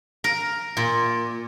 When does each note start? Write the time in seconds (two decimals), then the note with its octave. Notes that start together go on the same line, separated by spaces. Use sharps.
0.24 A#4
0.77 A#2